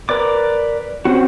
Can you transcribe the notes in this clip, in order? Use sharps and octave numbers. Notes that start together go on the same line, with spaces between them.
A#4 B4 D5 D6
C4 C#4 F#4